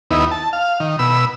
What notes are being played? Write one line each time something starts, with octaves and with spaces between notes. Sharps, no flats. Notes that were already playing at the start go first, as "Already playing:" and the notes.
D#2 B3 D#4 E4
A5
F5
D#3
B2 B5 E6